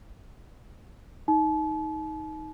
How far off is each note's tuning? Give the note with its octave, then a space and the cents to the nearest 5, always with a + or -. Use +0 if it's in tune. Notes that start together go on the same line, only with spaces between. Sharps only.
D#4 +15 A5 -40